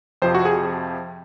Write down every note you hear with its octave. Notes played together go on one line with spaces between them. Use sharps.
F2 C3 F3 C5
F#4
G#4